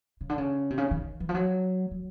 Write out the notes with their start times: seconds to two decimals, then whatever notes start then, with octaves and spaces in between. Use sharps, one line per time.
0.21 C#3
0.29 D3
0.38 C#3
0.70 C3
0.78 C#3
0.91 D#3
1.20 E3
1.29 F3
1.34 F#3
1.91 F#3